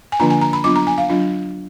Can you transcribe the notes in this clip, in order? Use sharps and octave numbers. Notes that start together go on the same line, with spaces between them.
G#5
D3 F3 A#3 D4 F4 A#5
G#5
A#5
B5
F#3 B3 D4 F4 D6
A#5
G#5
F5
F#3 D4 F4